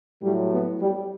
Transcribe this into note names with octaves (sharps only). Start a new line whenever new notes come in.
A2 F#3 G3
B3
G3